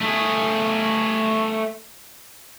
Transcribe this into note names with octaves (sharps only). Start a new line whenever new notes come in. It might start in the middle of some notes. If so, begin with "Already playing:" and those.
A3 G#4